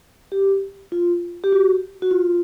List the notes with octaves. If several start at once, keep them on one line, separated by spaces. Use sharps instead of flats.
G4
F4
G4
F#4
F#4
F4